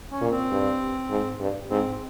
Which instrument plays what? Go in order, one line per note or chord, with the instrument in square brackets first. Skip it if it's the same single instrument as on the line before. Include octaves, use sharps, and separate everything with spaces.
[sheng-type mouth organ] C#4
[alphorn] A#2
[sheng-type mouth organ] C4
[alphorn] G2
G#2
G2
[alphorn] G#2 [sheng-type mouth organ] C4